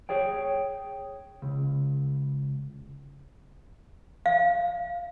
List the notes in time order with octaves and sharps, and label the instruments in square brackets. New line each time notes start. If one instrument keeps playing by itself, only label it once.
[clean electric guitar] G#4 C#5 G5
C#2
[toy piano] F5